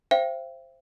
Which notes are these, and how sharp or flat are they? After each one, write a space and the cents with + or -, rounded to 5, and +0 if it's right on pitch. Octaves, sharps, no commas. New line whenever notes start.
C5 +5 E5 +45 G5 -10